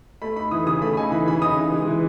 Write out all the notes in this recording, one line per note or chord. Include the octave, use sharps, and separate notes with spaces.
A3 B5
D#4 B5
E3 D#6
C#3 D#6
A3 B5
D#4 G#5
E3 B5
C#3 B5
D#4 D#6
E3
G#3
E3